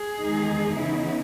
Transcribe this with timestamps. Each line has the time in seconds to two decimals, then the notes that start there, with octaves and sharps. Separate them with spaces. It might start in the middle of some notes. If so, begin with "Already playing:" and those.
Already playing: G#4
0.20 E2 D#3 G#3 D#4
0.77 C#3 E3 B3 D#4 E4